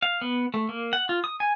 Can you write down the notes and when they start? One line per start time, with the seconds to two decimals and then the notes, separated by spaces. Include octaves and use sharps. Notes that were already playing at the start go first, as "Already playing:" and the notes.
0.02 F5
0.21 B3
0.54 A3
0.69 A#3
0.93 F#5
1.09 F4
1.24 D#6
1.40 G#5